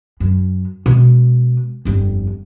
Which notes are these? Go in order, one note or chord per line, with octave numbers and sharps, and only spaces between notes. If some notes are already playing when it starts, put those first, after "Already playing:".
F#2
B2 G#3
G1 F2